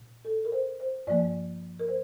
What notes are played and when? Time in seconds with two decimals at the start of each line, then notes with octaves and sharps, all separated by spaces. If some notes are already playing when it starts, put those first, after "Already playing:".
Already playing: A#2
0.25 A4
0.45 A#4
0.52 C5
0.80 C5
1.07 G2 F3 A#3 D5
1.79 A#4
1.88 C5